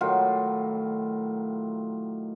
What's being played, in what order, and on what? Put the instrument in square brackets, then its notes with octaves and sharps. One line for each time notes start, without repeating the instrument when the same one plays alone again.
[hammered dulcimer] A2 D#3 F#3 F4